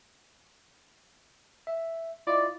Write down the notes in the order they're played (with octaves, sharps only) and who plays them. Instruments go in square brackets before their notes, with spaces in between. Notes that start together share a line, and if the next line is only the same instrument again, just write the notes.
[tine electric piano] E5
[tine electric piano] E4 F4 D#5 [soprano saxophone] D5